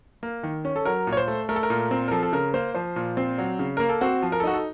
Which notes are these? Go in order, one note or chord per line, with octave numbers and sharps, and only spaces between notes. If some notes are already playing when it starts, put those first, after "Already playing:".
A#3
D#3
C#4
A4
F#3 A#4
A#2
C#5
C5
A3
A3 A#4
A4
A#4
A#2
C4
A#4
F3 A4
A4
C#3 A#4
A#3 C5
F3 C5
A#2
C4
F#3
C#3
A#3 A#4
A4
C4 F#4
F3
A#4
A4
D#4 F#4
A4